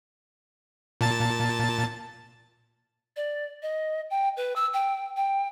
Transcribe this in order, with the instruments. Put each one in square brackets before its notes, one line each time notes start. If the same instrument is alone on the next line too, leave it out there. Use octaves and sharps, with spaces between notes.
[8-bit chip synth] A#2 A5 A6
[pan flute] D5
D#5
G5
B4
E6
G5
G5